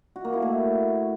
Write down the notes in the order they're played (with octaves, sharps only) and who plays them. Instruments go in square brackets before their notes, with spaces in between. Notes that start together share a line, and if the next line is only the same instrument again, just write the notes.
[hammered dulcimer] F#4
A#3
E4
A3